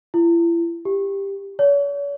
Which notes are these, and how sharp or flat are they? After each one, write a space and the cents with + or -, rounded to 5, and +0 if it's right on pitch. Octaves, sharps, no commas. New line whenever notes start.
E4 +40
G4 +10
C#5 +45